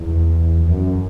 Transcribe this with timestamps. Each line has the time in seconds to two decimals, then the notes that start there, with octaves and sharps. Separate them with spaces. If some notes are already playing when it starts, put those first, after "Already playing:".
Already playing: E2
0.62 E2
0.68 F#2